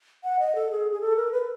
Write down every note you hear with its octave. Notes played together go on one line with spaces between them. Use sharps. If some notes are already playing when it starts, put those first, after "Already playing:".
F#5
D#5
A4
G#4
G#4
A4
A#4
B4